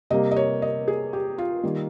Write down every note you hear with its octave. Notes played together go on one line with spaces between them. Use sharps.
C3 G3 A#3 D#5
D#5
C#5
D#5
G#4
G4
F4
D#3 G3 A#3